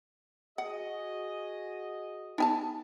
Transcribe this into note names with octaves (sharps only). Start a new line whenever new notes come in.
F#4 G#4 D#5 F#5
B3 D#4 G#5 A5